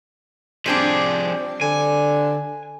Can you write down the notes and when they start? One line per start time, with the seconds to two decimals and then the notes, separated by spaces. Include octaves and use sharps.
0.66 F3 G3 C4 D4 G#4
1.61 D3 G#5